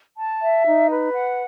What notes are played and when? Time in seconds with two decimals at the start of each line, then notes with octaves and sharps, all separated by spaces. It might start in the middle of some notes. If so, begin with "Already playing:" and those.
0.17 A5
0.42 E5
0.65 D#4
0.89 B4
1.13 F#5